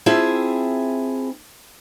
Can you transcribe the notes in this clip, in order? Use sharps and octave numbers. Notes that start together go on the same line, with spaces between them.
C4 E4 F4 G#4 E5 A5